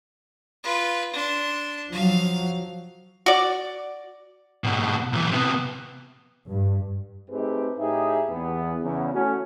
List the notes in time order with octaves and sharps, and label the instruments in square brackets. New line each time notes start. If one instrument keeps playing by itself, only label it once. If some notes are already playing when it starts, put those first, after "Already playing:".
[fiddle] F4 B4
D4 C6
[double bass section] F3 F#3 [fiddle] F5
[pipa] F#4 D5
[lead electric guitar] G#2 B2
B1 E3
C3 B3
[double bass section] G2
[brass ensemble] A3 C4 D#4 G4 G#4 B4
A2 D#4 G4 G#4 E5
E2 B3
E2 C#3
A3 C#4 F#4